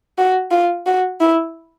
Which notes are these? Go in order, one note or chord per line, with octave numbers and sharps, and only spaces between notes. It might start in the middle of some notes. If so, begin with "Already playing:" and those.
F#4
F4
F#4
E4